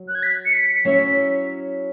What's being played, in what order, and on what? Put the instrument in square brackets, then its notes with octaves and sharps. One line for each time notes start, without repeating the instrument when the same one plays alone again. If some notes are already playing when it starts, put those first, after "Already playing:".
Already playing: [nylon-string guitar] F#3
[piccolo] F#6
G#6
B6
C#7
B6
[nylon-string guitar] F#3 C#4 E4 C#5 E5